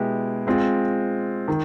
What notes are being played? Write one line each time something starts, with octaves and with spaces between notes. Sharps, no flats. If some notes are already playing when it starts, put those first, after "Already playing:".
Already playing: B2 G#3 B3 E4 G4
G#3 C4 F4
D#3